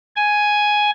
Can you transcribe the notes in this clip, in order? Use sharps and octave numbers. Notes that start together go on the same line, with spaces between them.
G#5